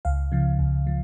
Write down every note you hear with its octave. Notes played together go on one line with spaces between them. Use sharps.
C#2 F5
C#3 F3
C#2
F3